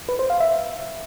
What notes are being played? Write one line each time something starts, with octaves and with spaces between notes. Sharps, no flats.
B4
C5
F5
E5